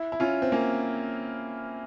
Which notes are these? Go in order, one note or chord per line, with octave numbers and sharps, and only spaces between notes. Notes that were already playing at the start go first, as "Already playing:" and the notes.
Already playing: E4
E4
C#4 F4
C4
A#3 C#4